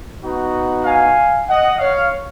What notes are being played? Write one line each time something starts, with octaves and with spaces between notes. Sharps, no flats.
B3 D#4 F#4
F5 G#5
D#5 F#5
C#5 F5